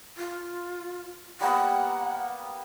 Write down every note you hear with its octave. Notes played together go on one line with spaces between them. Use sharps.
F4
G3 A#3 B3 F#5